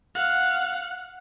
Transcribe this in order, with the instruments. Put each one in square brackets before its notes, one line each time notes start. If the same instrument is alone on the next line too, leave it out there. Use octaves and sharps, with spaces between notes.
[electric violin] F5 F#5